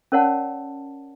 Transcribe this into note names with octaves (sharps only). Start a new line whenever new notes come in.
C#4 A#4 C#5 D5 F#5 A5